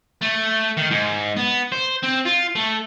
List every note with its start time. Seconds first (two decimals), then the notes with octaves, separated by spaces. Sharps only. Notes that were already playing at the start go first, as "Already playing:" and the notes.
0.22 A3
0.77 D#3
0.91 G#2
1.37 B3
1.72 C5
2.03 C4
2.25 F4
2.56 A3